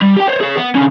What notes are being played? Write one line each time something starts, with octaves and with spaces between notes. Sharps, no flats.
G3
G4 G5
C5 C#5
G#4 C#5
B3
D3 C#4